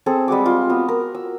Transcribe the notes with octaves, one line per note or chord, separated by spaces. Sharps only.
C4 G#4 A4
G3 G#3 F#4 D6
F4
B3 F#4
A#4
E6